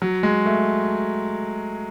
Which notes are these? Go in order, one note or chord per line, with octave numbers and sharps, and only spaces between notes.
F#3
G#3
A3